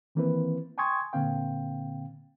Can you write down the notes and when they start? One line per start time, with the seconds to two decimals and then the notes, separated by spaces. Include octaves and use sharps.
0.15 D#3 E3 A#3 C4 E4 B4
0.78 G5 G#5 C6 C#6 D#6 G#6
1.13 A#2 D3 A#3 C4 F5 G5